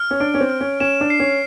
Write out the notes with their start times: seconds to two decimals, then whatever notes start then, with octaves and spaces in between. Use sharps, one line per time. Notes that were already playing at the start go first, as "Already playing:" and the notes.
Already playing: F6
0.11 C#4
0.20 D4 D7
0.34 C#4
0.40 C4
0.50 F6
0.61 C#4
0.80 C#4 E7
1.01 D4
1.10 C7
1.19 C#4